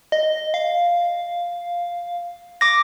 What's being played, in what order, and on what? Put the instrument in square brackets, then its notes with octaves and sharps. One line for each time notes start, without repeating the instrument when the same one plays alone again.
[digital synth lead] D#5
F5
[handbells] D6 A#6